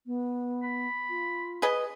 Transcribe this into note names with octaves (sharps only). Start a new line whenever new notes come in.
B3
B5
F4
G#4 B4 D#5